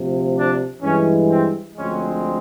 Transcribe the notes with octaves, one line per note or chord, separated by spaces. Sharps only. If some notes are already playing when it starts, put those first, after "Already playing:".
Already playing: D2 C3 F3
D4
G2 E3 G#3 C#4
C4
D2 D3 F3 G#3 C4 C#4